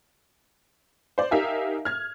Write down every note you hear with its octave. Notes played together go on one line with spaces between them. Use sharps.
C5 D5
D#4 G4 A#4 E5 F5 G#5
F6 G#6